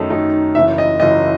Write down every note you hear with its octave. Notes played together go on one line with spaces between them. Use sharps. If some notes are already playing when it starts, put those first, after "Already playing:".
Already playing: F#2 D#3 A3 D#4 A5
F#2 D#3 A3 D#4
F#1 F#2 E3 E5
D#5
F#1 F#2 E3 D#5